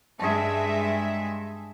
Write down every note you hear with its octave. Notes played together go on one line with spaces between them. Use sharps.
G2 G#3 G#4 E5 A5